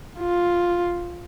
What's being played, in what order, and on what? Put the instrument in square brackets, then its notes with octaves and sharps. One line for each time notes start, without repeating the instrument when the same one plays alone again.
[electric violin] F4